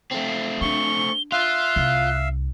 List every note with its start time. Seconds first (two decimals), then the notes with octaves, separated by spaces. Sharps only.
0.12 A3 C4
0.61 D4 C#6 G7
1.32 F4 E5 F5 F#6
1.76 C2